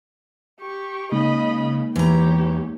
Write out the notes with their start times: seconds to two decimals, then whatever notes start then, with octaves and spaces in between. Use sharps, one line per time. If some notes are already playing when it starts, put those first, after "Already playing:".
0.60 G4 C#6
1.12 C#3 G#3 A#3 D#4 D#5 B5
1.96 E2 E3 G4 C#5 A#5